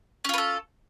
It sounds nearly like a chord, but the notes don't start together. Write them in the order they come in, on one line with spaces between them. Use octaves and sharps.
C#4 F4 B4 A4